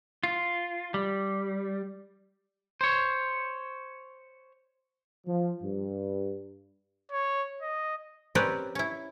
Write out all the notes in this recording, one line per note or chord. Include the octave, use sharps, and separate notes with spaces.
F4
G3
C5 C#5
F3
G2
C#5
D#5
C4 C#4 G4 A#4 B4 D5
C#4 E4